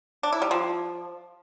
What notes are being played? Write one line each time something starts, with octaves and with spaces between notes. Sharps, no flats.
D4
E4
G3
F3